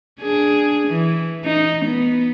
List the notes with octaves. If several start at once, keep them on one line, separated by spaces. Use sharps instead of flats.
D4 G#4
E3
D#4
B3